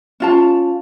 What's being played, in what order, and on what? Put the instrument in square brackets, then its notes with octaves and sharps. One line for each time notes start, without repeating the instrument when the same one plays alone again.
[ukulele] C#4 F4 A5